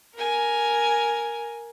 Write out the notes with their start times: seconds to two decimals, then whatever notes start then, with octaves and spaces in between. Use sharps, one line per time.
0.15 A#4 G#5